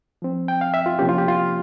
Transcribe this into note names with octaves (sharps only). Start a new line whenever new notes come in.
F3 C4
G5
F5
E5
F4
C3 F3 A#3 C#4 G4
F4
G4
F4